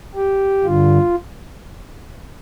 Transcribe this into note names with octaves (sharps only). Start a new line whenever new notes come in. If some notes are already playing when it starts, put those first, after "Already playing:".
G4
G2 D3 F4